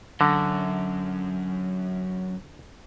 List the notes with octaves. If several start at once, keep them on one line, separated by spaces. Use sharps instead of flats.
F#2 D3